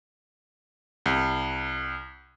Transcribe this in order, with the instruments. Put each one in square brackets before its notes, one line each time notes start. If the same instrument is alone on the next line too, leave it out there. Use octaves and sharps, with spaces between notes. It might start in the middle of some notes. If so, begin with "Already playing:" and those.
[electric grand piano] C2